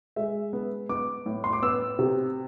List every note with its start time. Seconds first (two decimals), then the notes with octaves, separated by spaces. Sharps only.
0.16 G#3 E5
0.53 B3
0.89 B3 D6
1.26 A2
1.44 C6
1.53 D6
1.62 B3 E6
1.99 C3